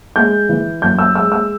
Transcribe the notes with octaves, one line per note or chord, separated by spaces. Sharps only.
G#3 G6
E3
F#2 G6
E6
G#3 E6
E6